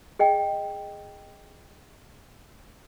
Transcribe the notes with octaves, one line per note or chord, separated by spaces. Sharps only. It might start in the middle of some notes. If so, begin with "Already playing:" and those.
G#4 D#5 G5